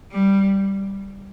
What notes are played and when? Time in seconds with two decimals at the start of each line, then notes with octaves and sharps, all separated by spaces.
0.11 G3